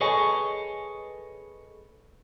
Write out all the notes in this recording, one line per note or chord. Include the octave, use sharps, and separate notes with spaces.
G#4 A4 B4 C#5 D#5 G#5